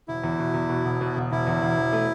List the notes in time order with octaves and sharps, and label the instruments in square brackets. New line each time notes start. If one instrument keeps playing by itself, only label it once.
[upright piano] E1 [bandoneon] E4
[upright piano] E2
B2
E2
B2
E1
B2
E1
[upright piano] E1 [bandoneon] E4
[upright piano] E2
E1
E1
A3